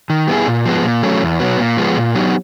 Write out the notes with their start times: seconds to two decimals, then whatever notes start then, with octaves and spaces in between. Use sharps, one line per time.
0.10 D#3
0.27 G3 B3 E4 G#4
0.47 A#2
0.66 F3 G#3 B3
0.84 A#2
1.03 F#3 A3 C#4
1.22 E2
1.40 B2 F#3 B3
1.59 A#2
1.77 F3 G#3 B3
1.96 A#2
2.15 F#3 B3 D#4 G4